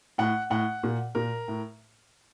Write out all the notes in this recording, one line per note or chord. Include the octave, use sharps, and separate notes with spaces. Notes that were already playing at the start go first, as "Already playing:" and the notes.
A2 F#5
A2 F#5
A#2
A#2 A#4
A2